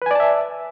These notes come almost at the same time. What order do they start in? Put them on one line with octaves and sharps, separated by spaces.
B4 G#5 D5 A5 E5